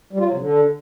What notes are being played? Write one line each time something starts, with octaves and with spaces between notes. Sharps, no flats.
G3
F4
F#3
C3
D3